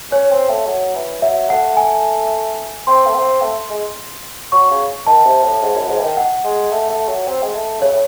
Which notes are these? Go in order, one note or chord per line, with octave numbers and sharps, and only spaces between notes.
C#4 C#5
C4
A3
F#3
E3
F#3 E5
A3 F#5
G#5
C4 C6
A3
C4
A3
G#3
F#3 C#6
C#3
D#3 A5
C3
A2
G#2
F#2
G#2
E3
D#3
F#5
G#3
A3
A3
F#3
C4
G#3
A3
C#3 C#5
A2